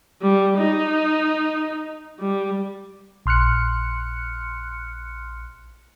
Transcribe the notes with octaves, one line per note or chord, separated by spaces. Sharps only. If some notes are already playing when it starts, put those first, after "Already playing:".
G3
D#4
G3
A#1 C6 F6 F#6 C#7